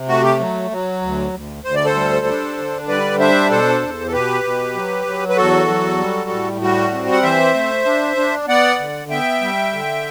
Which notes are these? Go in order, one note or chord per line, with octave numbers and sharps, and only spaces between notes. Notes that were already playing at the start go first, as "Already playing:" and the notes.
Already playing: C3
A3 F#4
G4
F#3
F#3
D2
D2
D2 C5
D5
A4 C5
G3
D4
D3
G3 B4 D5
D4 C5 E5
B2 A4 C5
E2
A4
B2 G4 B4
B2
F#3
F#3
B4
E2 F#4 A4
F#3
G3
A2
G3 F#4
C4
F#5
E3 C5 E5
A3
D4
D4
B3 D5 F#5
D3
B3 E5 G5
G3
D3